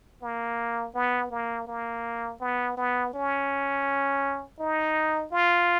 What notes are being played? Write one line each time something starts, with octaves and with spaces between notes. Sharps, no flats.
A#3
B3
A#3
A#3
B3
B3
C#4
D#4
F4